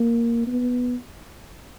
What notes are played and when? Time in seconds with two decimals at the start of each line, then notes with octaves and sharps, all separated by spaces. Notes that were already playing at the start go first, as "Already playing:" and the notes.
Already playing: A#3
0.47 B3